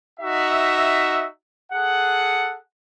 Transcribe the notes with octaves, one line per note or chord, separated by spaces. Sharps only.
D#4 F#4 E5
G#4 A4 F#5